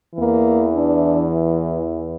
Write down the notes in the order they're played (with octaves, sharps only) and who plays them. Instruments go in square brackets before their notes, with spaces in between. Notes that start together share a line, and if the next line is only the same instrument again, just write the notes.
[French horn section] E2 E3 A#3
D4